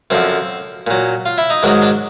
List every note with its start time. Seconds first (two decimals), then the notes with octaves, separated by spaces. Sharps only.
0.10 F#2 D3 F3 C4
0.87 A#2 F#3
1.26 F4
1.38 E4
1.50 D#4
1.63 G#2 D#3 F#3 D4
1.82 D4